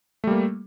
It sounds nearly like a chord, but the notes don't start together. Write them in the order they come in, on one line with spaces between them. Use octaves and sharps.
A3 G3 A#3